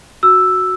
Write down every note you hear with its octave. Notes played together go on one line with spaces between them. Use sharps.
F#4 E6